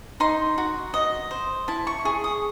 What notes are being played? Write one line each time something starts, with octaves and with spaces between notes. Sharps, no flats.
D#4 C6
F#4
D#5
C5
E4 A5
C#6
G#4 C#6
D#6